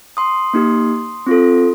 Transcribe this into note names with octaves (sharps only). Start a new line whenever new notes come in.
C6 D#6
A#3 D#4 G4
C4 F4 A4